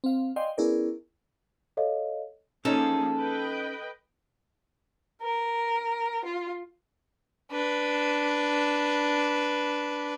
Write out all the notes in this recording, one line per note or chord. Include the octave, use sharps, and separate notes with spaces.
C4 F5
D5 D#5 F5 G5 G#5 C6
B3 C#4 E4 G#4 A#4 D5
A4 C#5 D#5 F5
F3 A#3 C#4 D#4 G#4 A4
B4 D#5 G5
A#4
F4
D4 B4